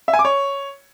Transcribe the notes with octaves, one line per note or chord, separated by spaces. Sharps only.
E5
G#5
D6
C#5